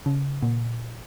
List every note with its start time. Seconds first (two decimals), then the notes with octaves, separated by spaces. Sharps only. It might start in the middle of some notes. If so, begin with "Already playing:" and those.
0.06 C#3
0.43 A#2